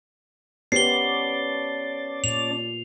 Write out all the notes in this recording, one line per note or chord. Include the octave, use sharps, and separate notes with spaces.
B3 C#4 G4 C5 D5 A5 C7 G7
A#2 F7